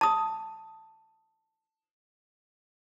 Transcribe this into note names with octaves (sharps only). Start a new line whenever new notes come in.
A5 D#6